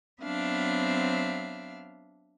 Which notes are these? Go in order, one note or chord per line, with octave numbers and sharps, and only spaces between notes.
F#3 B3 C4 D4 E5 F5